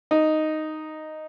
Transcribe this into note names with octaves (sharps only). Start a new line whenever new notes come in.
D#4